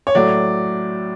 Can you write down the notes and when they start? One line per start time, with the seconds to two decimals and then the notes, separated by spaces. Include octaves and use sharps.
0.07 C#5
0.15 A2 F#3 A3 D5